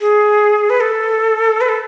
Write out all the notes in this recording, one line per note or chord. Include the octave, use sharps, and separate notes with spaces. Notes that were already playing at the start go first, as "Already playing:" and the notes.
G#4
B4
A4
B4
A4